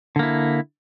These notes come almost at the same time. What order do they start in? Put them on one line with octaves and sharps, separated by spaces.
D3 A#3 E4